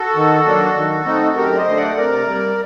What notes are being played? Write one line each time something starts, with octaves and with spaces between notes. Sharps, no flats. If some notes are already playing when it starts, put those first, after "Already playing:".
Already playing: F#4 A4
D#3
F#3 A#3 D4
D#3
A3 C4 D#4
F#2 G4 A#4
D5
C5 D#5
D3 A3
D5 F#5
C3 A#4 D5
G3 A#3